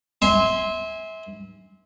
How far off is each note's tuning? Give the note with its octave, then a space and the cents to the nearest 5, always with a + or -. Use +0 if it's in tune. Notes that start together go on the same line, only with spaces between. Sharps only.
E5 -30 G#5 -15 C6 +0